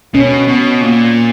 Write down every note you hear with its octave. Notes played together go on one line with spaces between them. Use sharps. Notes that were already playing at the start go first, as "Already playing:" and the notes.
B2 C#4
B2
A#2